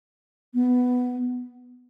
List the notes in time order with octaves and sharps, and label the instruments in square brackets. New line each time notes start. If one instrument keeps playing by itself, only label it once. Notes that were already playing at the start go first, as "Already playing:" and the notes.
[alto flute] B3